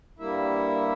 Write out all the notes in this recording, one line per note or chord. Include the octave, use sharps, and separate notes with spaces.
G2 G3 A#3 E4 E5